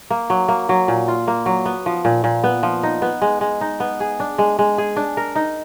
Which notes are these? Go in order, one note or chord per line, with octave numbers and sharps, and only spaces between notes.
A#3
F#3
A#3
F#3
A#2
F4
A#3
F#3
B3
F3
A#2
A#2
B3
F3
D#4
B3
G#3
G#3
D#4
B3
G#4
D4
G#3
G#3
G#4
D4
A#4
D#4